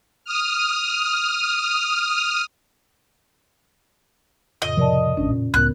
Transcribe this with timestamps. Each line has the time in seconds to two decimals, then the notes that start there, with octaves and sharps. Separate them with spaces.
0.25 D#6 F6
4.62 F2 A2 C#3 D#5
4.77 C3 F3 A#4 D5 A5
5.17 G#1 C#4 D4
5.30 A#2
5.54 C#2 A2 C#3 B3 A#4 F#6